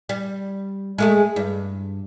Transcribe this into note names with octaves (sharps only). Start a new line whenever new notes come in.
G3
G#3 A3 G#4
G2